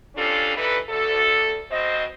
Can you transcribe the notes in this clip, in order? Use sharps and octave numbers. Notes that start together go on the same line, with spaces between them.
F2 G3 C#4 D4 F4 A4
E3 G3 D#4 A4 B4
D2 A4
B2 C4 C5 D#5